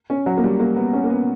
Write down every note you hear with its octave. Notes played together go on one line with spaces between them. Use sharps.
C#4
F#3
A#3
G3
A#3
B3
C#4
A#3
B3